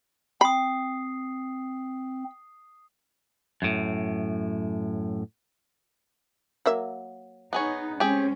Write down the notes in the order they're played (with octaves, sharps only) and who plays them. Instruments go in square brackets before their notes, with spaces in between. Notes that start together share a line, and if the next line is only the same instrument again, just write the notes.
[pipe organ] C4 [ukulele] G5 [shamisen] B5 [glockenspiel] D#6 C7
[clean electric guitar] F#2 A2
[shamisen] F#3 A#3 E5
[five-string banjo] B3 G#4 C#5 [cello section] D#4
[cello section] G#3 C4 C#4 [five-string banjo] G4 G#4